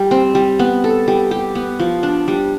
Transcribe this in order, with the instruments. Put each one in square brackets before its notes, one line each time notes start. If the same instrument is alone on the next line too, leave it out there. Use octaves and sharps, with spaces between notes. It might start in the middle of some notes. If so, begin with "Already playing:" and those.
Already playing: [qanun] G3
C4
G3
B3
A4
G3
G4
B3
F3
D4
G3